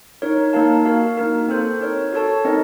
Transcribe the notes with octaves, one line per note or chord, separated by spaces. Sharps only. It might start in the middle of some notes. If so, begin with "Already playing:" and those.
D#4 A#4 C#5
A#3 D#4 A#4 F5 A5
F#4 A#4 F5
A#3 D#4 A#4
C4 F#4 A4 C5
D#4 A#4 C#5
F#4 A4 C#5 A5
C4 D#4 A#4 D#5